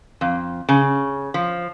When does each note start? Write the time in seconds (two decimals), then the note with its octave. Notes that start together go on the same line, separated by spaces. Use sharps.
0.21 F2
0.69 C#3
1.34 F3